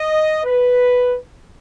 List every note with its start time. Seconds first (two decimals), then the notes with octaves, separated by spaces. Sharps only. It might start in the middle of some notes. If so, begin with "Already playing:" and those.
Already playing: D#5
0.44 B4